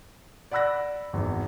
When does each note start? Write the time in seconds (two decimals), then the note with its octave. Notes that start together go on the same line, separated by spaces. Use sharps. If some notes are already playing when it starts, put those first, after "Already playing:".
0.51 D5 F#5 B5 E6 F#6 A#6
1.13 G#1 E2